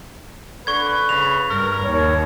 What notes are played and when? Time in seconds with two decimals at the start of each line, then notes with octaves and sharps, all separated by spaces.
0.67 D3 B4 C#6 G#6
1.09 C#3 F7
1.50 G2 A#4
1.84 D#2 C#5